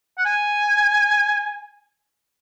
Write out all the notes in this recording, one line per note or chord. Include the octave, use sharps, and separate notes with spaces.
F#5
G#5